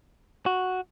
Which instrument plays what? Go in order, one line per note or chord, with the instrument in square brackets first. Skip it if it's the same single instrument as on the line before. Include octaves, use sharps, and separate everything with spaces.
[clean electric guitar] F#4